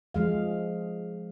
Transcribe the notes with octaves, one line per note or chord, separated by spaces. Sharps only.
F3 G#3 F5